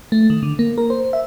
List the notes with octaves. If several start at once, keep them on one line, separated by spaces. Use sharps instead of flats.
A3
D#3
D3
A#3
A#4
C5
E5